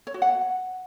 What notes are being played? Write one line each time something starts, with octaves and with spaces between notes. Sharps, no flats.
C#5
F#4
F#5